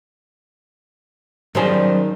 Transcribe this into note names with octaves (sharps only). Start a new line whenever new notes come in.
F#2 D#3 G3 G#4 C5 A5